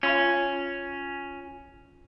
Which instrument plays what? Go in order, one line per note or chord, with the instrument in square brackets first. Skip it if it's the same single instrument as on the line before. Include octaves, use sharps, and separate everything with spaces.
[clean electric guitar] C#4 [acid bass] F4